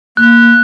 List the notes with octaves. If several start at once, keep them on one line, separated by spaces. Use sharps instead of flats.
A#3 F#6